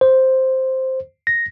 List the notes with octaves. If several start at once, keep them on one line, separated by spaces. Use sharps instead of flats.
C5
A#6